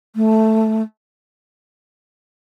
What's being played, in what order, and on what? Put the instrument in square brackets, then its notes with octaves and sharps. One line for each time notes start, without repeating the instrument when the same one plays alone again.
[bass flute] A3